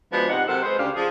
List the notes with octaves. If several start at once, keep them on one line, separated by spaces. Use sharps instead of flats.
F3 G#3 B3 D4 F#4
G#2 C3 D#4 F#5
C3 F#3 C4 A4 A#4 F#5
G#3 B4 C5
D2 C#3 G4 D5 F5
F3 G#4